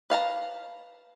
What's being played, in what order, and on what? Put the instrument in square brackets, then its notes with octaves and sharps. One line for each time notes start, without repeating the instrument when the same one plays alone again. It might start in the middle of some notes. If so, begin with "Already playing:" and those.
[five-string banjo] B4 F5 A5 A#5